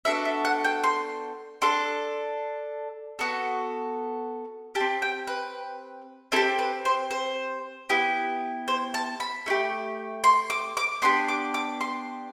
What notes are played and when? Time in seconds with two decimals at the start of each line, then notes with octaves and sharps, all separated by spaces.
0.05 B3 D4 F#4 A4 E5
0.25 E5
0.45 F#5
0.64 G5
0.84 C6
1.62 D4 A4 C6
3.19 B3 F#4 A4
4.75 G4 A5
4.80 C4
5.02 G5
5.27 B4
6.32 C4 E4 A4
6.36 G4
6.59 B4
6.85 C5
7.11 C5
7.89 B3 E4 G4
8.68 C5
8.94 A5
9.20 B5
9.46 A3 E4 G4
10.24 C6
10.50 D6
10.77 D6
11.02 B3 D4 G4 C6
11.28 D6
11.54 D6
11.81 C6